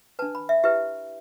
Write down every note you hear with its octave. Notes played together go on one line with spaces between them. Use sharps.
D4 B4 A5
B5
E5
E4 G4 B4 E5